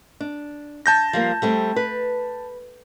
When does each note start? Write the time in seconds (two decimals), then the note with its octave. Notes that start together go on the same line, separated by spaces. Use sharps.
0.20 D4
0.86 A5 G6 A#6
1.13 F3 G3 A#3
1.42 G3 A3 C4
1.76 B4